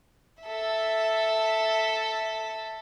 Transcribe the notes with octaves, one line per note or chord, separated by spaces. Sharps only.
A4 E5